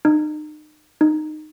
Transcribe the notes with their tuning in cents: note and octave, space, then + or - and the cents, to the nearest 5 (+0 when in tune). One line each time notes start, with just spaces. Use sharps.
D#4 -35
D#4 -15